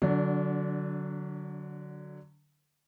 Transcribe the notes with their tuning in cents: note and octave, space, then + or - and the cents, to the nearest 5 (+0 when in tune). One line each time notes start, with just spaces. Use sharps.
D3 +0 F#3 +0 D4 -30